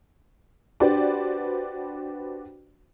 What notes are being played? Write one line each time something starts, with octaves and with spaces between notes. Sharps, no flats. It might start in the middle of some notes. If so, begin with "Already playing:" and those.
D4 F#4 G4 B4 C5 D5